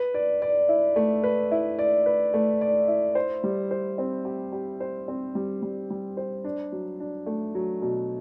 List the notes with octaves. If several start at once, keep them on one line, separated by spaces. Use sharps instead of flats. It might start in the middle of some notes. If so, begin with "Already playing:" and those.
Already playing: B4
D5
D5
E4
A3
B4
E4
D5
B4
A3
D5
E4
C5
G3
C5
C4
G4
G4
C5
C4
G3
G3
G3
C5
D4
F#3
D4
A3
F#3
B2